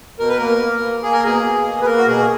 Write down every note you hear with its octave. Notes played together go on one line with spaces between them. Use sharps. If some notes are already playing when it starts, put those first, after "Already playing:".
B2 A#4
B4
A#3 A#4
A#3
A#3
A#3 G#4
A#4
B2 G#4
B2
A#3
B4
A#3 A#4
F#4
B2 G#4